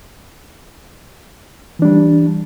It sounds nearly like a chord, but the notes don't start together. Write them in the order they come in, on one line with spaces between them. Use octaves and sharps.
E3 D4 G3